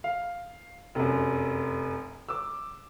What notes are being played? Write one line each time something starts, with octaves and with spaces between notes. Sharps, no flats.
F5
F1 F#2
D6 E6